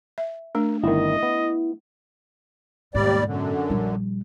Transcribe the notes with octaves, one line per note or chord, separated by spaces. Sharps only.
E5
A3 D4 A#4
G1 D#3 E4 D#5
B3
D#2 G#2 B2 G3 D5
F#2 D3
A#1 G3